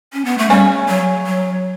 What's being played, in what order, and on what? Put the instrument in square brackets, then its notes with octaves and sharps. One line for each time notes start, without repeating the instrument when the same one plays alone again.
[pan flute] C#4
B3
A3
[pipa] C#3 C#4 [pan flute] G3
[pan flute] F#3
F#3